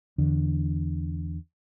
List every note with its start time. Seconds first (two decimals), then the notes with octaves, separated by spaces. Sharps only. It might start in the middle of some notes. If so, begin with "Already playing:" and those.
0.18 E2 D3